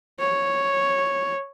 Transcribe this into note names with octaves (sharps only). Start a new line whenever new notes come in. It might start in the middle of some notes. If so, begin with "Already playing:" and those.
C#5